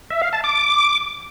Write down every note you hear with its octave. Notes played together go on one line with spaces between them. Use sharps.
E5
F5
A5
D6